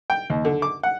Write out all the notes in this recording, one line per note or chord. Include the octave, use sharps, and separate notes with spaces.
G5
D#2
D3
D6
F#5